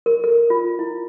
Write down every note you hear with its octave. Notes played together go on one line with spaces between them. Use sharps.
A#4
A4
F4
E4